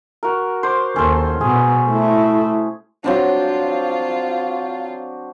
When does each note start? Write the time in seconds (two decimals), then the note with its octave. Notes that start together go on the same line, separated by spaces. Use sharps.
0.23 F#4 A#4
0.63 C5 C6 D6
0.96 D#2 C#4 A4 C5
1.41 B2 B3 G#4
1.88 A3 E4
3.04 F#3 C4 D4 F4